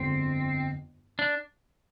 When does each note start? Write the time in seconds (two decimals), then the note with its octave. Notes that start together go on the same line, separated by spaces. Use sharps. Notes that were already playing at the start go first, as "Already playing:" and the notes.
Already playing: G1 F2 D3 G#3 C4
1.19 D4